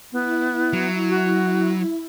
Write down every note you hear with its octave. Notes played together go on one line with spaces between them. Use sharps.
B3 E4
F#3
F#4